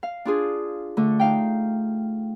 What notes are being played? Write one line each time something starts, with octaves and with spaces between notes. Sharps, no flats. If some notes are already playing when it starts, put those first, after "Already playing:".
F5
D4 F4 G#4
D3 A3
D#4 F5 G5